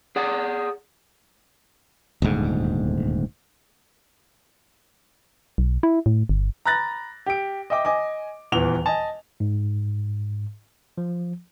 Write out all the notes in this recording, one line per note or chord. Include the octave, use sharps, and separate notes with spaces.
G#4 D5 F#5
D#1 D2 G#2
B1
E4
A2
G1
A#5 B5 F#6 A6 A#6
G4 D7
D#5 E5 G5 D6
D#5 G#5 D6
D#1 E2 E3 F7 G7
D#5 G#5 A5
G#2
F3